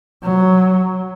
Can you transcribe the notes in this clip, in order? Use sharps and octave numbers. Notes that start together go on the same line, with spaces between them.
F#3